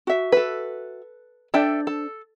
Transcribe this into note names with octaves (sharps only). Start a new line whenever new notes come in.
F#4 E5
A4 B4
D4 A4 C5 D5 E5 G5
A4